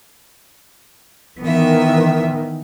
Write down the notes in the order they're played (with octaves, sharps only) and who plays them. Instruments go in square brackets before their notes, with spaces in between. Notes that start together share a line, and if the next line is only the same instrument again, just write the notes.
[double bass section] D#3 E3 [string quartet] B3 E5